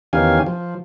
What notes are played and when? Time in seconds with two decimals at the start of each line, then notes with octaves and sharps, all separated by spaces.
0.13 E2 D#3 C#4 G4 F5 G#5
0.46 F3